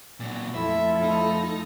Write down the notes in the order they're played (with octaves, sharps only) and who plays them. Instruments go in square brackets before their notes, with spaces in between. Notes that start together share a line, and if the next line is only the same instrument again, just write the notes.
[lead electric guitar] A#2 F#3
[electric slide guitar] F2 [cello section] A3 F4 A4 [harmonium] E4 [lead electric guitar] E5
[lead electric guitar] D#4